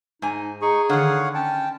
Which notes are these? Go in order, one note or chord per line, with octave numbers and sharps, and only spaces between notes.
G#2 D#4 G#5
D#4 G#4 C#6
D3 D#3 C#5 F5 F#5
C#4 G5 A5